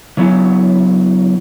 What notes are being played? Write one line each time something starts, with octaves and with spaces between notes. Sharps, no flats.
C#3 F#3 B3 E4 G#5